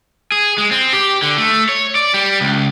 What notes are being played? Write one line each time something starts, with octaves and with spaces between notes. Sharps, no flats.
G#4
G#3
C4
G4
D3
A3
C#5
D5
G3
C#2